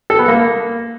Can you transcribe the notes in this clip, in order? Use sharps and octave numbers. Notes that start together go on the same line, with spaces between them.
A4
B3
A#3